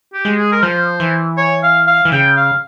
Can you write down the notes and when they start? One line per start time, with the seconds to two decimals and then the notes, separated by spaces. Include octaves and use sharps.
0.13 G4
0.25 G#3
0.38 G#4
0.52 A#4
0.62 F3 C5
1.00 E3
1.37 C#5
1.63 F5
1.87 F5
2.05 E3
2.12 C#3 G5
2.36 F5